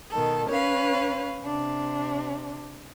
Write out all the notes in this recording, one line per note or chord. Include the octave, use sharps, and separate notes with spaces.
B2 D#3 A4
C#4 B4 C#5 F5
C3 D4